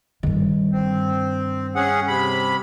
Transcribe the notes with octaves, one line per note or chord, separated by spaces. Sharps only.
G2 D#3
C4
C#4 G#4 F#5
C3 B5